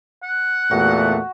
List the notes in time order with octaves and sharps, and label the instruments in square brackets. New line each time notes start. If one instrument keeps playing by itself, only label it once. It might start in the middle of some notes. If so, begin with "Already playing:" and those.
[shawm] F#5
[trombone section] E2 A#2 A3 [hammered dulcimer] F#4